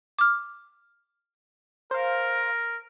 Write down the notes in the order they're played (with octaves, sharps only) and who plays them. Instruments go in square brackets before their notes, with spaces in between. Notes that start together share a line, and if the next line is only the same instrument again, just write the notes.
[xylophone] D6 F6
[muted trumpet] A#4 [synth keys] C5 F5